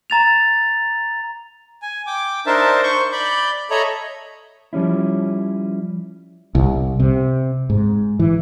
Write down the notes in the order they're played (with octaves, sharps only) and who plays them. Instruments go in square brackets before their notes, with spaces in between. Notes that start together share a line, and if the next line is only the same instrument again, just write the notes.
[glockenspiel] A#5 A6 F7
[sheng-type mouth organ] G#5
G5 D6
D4 D#4 A#4 C5 E5 A5
C5 C#6 G6
D5 B5 G6
A4 C#5 D#5 E5 A#5 B5
[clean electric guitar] F3 G3 C#4 E4
[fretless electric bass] C2
C3
G#2
E3